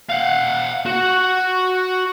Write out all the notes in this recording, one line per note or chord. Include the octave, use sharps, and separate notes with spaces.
F5 F#5
F#4 F#5